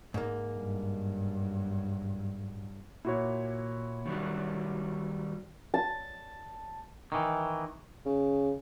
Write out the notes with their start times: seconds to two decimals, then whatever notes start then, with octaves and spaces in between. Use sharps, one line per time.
0.14 G#2 A#3
0.55 G2 F#3
3.05 A#2 E4 F#4 C#5
4.06 D#3 F#3 G3
5.74 A5
7.12 D#3 E3
8.06 C#3